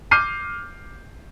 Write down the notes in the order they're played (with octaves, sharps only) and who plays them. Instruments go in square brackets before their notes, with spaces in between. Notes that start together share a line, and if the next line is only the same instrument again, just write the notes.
[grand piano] D6 F6 G6 C7 D#7